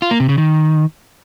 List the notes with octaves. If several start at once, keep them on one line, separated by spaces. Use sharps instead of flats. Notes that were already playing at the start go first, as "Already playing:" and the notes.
F4
A#3
C3
C#3
D#3